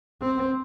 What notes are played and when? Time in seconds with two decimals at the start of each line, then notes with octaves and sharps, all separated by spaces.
0.22 C4